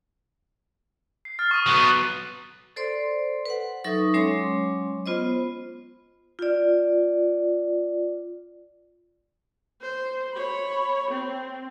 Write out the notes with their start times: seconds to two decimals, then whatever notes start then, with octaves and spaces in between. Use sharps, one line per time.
1.25 C7
1.39 F6 A6
1.51 C#6 D#6 D#7
1.67 F#3 B3
2.76 A4 C5 D5 C6
3.46 B4 F#5
3.84 F#3 D#4 A4 E5 C#6 D#6
4.14 F#3 G#3 C#4 C#5 C6 D6
5.06 B3 F4 C5 D#5
6.39 F4 D5
9.81 C5
10.33 C#5 B5
11.11 C4